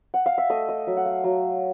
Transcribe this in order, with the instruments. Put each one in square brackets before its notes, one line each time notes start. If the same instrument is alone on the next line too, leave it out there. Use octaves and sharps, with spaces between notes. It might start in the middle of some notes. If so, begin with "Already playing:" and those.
[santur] F#5
F5
E5
A3 D#5
D#5
F#3 E5
F#5
F5
F#3